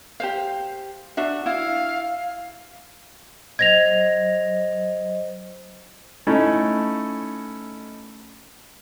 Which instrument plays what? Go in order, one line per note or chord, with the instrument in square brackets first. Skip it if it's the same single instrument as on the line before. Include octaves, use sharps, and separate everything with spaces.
[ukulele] G4 C5 F5
D4 F#4 E5
[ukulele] E4 [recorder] F5
[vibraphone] F#3 C5 D#5 [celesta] G#6 A#6 F7
[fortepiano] A3 C#4 D#4 E4